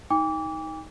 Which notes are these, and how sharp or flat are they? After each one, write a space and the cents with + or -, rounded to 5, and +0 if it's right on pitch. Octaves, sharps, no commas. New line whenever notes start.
D#4 +15 G5 +45 D6 -25